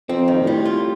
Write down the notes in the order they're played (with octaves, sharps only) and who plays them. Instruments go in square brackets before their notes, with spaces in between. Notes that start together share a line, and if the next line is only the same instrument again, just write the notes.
[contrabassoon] F2 [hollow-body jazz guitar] C4
[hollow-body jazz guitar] D#3
[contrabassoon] A#2
[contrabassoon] A2 [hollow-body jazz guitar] G3
[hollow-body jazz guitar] F4